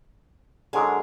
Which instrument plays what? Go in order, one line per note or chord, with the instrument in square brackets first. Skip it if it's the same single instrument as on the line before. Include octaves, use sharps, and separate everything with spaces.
[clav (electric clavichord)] D3 F#3 G#3 [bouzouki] G#4 A#4